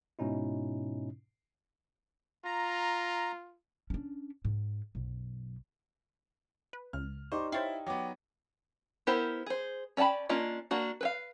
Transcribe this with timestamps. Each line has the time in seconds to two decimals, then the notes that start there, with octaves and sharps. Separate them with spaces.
0.19 G#2 B2 C#4 D#4 E4
2.45 F4 A#5
3.90 C#4 D4
4.45 G#2
4.95 B1 F#2
6.73 B4
6.93 C#2 F6
7.32 D#4 G4 C5 D5 C#6 D6
7.52 E4 C5 C#5 E5 F5 G5 A6
7.87 F#3 B3 G5 D6
9.07 B3 E4 G4 A#4 C5
9.46 G#4 C5
9.97 C#4 D5 G5 A5 B5
10.29 A#3 C#4 D4 F4 D#5
10.71 A#3 D4 F#4
11.01 B4 C5 F5